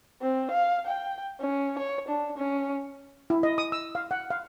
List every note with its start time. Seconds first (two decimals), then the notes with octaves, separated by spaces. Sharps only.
0.22 C4
0.51 F5
0.87 G5
1.41 C#4
1.79 C#5
2.08 D4
2.38 C#4
3.30 E4
3.43 D#5
3.58 D#6
3.72 E6
3.95 F5
4.11 F#5
4.30 F5